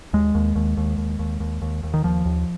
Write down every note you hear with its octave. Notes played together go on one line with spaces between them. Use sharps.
D#2 G#3
D#2
D#2
D#2
D#2
D#2
D#2
D#2
D#2
D#3
D#2 F3
D#2